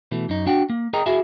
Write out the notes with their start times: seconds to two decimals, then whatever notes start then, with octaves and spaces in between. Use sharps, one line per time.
0.12 B2 E3 A3
0.29 F#2 D#4
0.46 D4 F#4 F#5 G5
0.70 A#3
0.93 G#4 A#4 D#5 G5 A#5
1.06 E4 F#4 G#4 E5 G#5